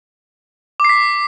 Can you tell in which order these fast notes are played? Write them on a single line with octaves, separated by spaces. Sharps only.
D6 C7 B6